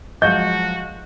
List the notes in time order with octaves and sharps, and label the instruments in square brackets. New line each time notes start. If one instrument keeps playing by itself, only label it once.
[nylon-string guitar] F3 F#3 G#3 [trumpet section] F#4 [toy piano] D#5 [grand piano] F5 G6